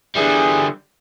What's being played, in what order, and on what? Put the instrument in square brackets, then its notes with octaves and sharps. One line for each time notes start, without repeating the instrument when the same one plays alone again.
[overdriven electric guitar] D3 G3 [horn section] E3 G#4